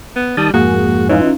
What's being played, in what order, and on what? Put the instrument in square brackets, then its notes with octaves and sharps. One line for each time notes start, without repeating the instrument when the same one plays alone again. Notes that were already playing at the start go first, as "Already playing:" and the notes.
[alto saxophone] B3
[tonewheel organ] D#3 A5 D#6 [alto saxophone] G3
[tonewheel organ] F2 G#2 [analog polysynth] A#3 G#4 [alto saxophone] F#4
[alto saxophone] E3 [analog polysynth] C#4 D#4 F4